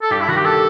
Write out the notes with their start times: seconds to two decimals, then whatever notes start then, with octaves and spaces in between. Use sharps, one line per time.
0.02 A4
0.10 G2 G4
0.21 E4
0.28 D#3 F#4
0.37 G4
0.45 A4